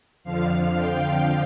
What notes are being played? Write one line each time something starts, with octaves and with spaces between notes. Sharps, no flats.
F2 D3 F3 F5
G5